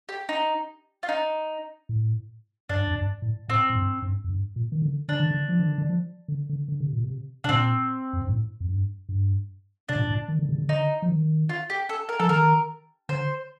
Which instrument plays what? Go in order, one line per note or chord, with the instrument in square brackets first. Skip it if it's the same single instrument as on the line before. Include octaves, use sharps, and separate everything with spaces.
[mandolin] G4
D#4
F4
D#4
[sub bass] A2
[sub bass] G2 [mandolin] D4
[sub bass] F2
G2
A2
[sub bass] A2 [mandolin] C4
[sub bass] A2
G2
G2
F2
G2
A#2
D#3
D3
[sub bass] D3 [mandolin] D4
[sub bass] D#3
D3
F3
D#3
D3
D#3
F3
D3
D3
D3
C3
A#2
C3
[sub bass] C3 [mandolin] D4
[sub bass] A#2 [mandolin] C4
[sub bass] F2
G2
A2
F2
G2
G2
[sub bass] C3 [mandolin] D4
[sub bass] A#2
A2
A#2
D#3
D3
C3
D3
[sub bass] D3 [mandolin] D#4
[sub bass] F3
D#3
[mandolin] F4
G4
A4
A#4
[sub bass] F3 [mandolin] A4
[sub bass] D#3 [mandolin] A#4
[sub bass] D3 [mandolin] C5